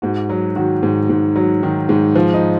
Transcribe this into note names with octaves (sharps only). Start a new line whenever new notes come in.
G#2 F#4
F#3
D#3 F#4
G#2
G#2
F#3
D#3
G#2
F3
D#4